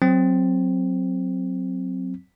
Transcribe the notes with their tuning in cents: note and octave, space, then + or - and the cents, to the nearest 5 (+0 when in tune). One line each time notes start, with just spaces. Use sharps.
F#3 +0 C4 +0